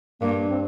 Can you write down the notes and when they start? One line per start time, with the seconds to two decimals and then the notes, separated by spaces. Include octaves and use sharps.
0.22 G2 A#3
0.51 C4